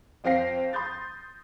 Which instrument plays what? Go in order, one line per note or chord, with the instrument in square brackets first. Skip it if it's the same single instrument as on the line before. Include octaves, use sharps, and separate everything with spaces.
[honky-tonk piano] F2 C4 F5 G5 A#6 C7
C6 D#6 G6 A6